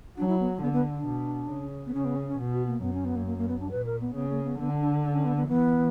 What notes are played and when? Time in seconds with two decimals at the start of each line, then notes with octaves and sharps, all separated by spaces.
0.17 F#3 D4
0.28 E4
0.40 B3
0.62 D3 B3
0.72 B3
0.95 D4
1.06 B2
1.50 C#3
1.86 B3
1.94 C#3 C#4
2.05 B3
2.16 C#4
2.28 C#4
2.38 B2
2.53 F#4
2.67 A#3
2.82 F#2 B3
2.94 C#4
3.05 B3
3.16 A#3
3.26 A#3
3.38 A#3
3.48 B3
3.60 D4
3.71 A#2 B4
3.86 A#4
4.01 B3
4.15 C#3 B3
4.30 A#3
4.44 B3
4.59 D3 B3
4.70 D4
4.81 D4
5.04 D4
5.14 C#4
5.25 B3
5.36 B3
5.48 E3 B3